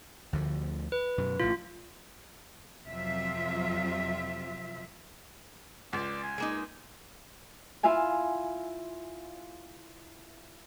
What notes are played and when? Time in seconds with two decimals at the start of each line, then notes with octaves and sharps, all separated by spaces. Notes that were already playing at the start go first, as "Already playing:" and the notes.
0.33 D2 D3 F3
0.92 B4
1.18 F#2 B2
1.40 A1 A2 E3 F4
2.84 F2 C3 F#3 C4 F4 E5
5.93 C#2 D5
6.23 G#5
6.38 G#3 A#3 D#4
7.83 E4 F4 E5 F5 G#5